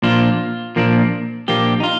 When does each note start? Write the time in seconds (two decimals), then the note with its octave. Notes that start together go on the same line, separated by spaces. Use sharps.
0.03 A#2 F3 A#3 D4 F4
0.76 A#2 F3 A#3 D4
1.48 A#2 F3 A#3 D4 G4
1.80 D#4
1.83 F4